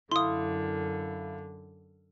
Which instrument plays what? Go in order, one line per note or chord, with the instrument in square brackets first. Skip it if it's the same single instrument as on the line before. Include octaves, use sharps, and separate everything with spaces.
[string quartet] F#2 D3 [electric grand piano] E4 F5 [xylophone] C6 D#6